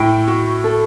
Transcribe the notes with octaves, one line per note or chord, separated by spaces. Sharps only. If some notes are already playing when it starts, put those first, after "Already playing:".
Already playing: A2 G5
F#4
A4